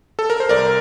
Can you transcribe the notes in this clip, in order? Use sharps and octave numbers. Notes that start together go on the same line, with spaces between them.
A4
A#4
C5
C2 A#4 D5